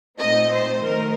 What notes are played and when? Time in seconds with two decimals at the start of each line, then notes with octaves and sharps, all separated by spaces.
0.19 A#2 A3 C4 D#4 D#5
0.52 C5
0.85 D#3 F#3 A3 D#4 A#4